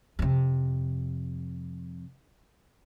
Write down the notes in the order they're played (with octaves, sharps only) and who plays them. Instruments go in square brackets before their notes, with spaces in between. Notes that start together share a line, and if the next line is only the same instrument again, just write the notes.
[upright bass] F2 C3